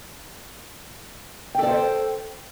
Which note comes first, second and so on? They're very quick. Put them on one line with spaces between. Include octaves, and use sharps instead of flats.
G5 A4 D5 C5